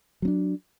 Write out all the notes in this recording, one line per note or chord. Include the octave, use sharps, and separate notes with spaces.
F#3 C4 D4